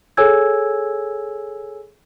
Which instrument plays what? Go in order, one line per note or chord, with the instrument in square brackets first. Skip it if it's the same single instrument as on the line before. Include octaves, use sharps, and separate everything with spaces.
[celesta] G#4 A4 C#5 G#5 E6 G#6